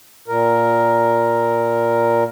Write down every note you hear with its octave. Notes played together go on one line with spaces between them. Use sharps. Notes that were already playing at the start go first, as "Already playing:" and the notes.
A#2 A#4